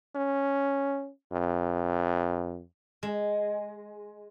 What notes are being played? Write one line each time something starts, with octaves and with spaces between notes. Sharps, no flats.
C#4
F2
G#3